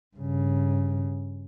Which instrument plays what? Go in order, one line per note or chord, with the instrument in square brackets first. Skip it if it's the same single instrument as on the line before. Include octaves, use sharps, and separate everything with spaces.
[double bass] G2 C#3